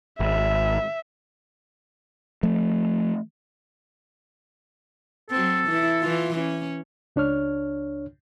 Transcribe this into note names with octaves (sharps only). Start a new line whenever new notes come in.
G#1 E5
F3 A3
F#3 C4 A4
E3 E4
E3 F4
C#4
C#2 D4 C#5 F6